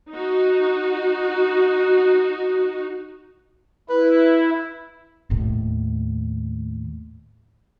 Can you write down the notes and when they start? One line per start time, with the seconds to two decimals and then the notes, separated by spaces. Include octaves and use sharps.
0.10 D#4 F#4
3.90 E4 B4
5.30 D#2 A2